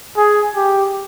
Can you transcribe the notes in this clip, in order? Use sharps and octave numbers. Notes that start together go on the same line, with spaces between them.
G#4
G4